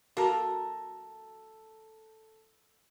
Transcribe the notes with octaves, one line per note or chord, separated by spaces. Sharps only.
A#3 F#4 A4 A#4 A5